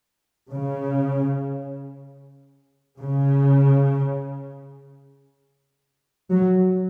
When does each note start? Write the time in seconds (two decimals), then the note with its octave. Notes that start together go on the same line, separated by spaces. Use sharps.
0.51 C#3
3.00 C#3
6.31 F#3